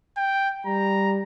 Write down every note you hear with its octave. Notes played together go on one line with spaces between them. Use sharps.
G5
G3 A#5